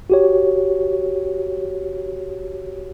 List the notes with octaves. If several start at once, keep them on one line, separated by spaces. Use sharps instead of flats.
F#4 G4 C#5